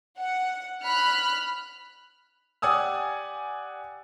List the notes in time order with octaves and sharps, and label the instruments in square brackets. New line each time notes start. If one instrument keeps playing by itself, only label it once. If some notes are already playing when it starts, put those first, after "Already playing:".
[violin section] F#5
B5 F6 F#6
[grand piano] G4 D5 F#5 G#5 D#6 E6